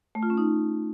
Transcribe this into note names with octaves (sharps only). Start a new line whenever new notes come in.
A3
F4
C#4
D#4